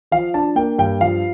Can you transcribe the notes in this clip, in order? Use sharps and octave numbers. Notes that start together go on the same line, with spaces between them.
F3 F5
D4 A5
A#3 G5
G2 G5
F3 F5